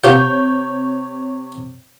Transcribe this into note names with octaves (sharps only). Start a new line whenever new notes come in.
C3 F4 G4 C#5 F#5 G6